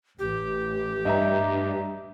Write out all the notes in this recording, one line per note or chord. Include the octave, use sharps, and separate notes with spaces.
A1 G4
G2 D#5 E5 A#5